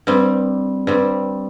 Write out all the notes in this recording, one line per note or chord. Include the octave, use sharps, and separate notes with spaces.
G2 G3 C4
G2 G3 C4